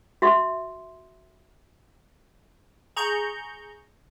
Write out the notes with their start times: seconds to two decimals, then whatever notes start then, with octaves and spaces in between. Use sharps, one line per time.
0.22 F#4 E5 C6
2.96 G#4 A#5 C#6 G6